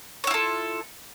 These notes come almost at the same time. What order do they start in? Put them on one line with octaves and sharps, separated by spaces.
C#5 E4 F4 A4